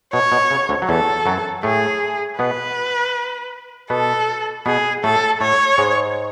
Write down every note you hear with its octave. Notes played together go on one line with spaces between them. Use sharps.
B2 C#5
B2
C#3
D2 D3
F#3
E2 E3 A4
F#2 F#3
A2 A3 G#4
B2 B3 B4
B2 B3 A4
B2 B3 G#4
A2 A3 A4
A2 A3 C#5
G#2 G#3